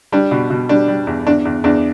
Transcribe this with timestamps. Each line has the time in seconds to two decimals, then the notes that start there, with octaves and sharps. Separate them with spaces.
0.12 G3 D4
0.31 B2
0.50 B2
0.69 G3 D4
0.88 G3
1.07 E2
1.27 E2 D4
1.45 E2
1.64 E2 D4